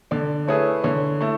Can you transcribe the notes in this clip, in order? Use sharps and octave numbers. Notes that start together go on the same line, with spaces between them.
D3 D5
A3 E4 G#4 B4 C#5
D3 C#5
A3 E4